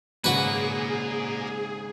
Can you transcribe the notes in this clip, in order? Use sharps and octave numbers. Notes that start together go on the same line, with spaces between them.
G#1 G#2 C#3 A#3 F#4 G#4 B4 D5